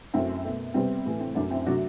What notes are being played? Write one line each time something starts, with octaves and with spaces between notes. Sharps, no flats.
F#2 F#3 A3 C4 E4
B2 A3
C3 G3 B3 C4
A2 E3 A3
C4
F#2 F#3 A3 D4
C4 E4
C3 F#3 A3 D4 F#4